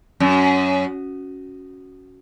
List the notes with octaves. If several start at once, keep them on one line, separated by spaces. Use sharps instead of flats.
F#2